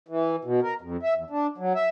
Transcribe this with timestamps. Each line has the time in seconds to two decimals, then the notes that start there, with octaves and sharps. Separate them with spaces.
0.08 E3
0.45 B2
0.63 A#4
0.81 F2
1.03 E5
1.14 E2
1.30 D4
1.58 F#3
1.75 E5